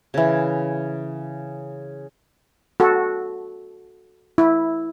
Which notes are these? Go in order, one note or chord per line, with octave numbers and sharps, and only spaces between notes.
C#3 E3
F#4 A4
E4